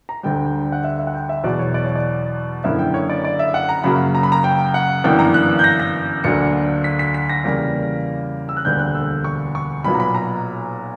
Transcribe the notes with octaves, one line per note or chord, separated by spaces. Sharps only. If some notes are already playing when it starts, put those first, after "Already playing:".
A#5
D2 D3 G3 G5
F#5
E5
E5
F#5
G5
E5
E2 B2 F#3 D5
C#5
D5
C#5
D5
F#1 F#2 D3 A#3 E4 E5
G5
C#5
D5
D5
E5
F#5
A#5
F#2 C#3 F#3 A#3 B5
A#5
B5
A#5
G5
F#5
G1 F#2 E3 A#3 D4 G5
A#5
F#6
G6
A#6
A#6
D2 D3 F#3 A#3 D4 C#7
B6
B6
B6
A#6
E2 C#3 G3 A#3 C#4
E6
F#6
E1 D2 D3 G3 A#3 G6
F#6
E6
C#6
C#6
B1 A#2 F#3 B3 B5
A#5
B5
A#5